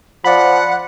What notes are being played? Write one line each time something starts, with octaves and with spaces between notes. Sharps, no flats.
F3 D5 F#5 B5